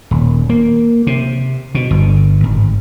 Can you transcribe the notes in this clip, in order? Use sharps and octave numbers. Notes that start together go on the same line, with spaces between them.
D#1
A#3
C3
B2
G1
G#1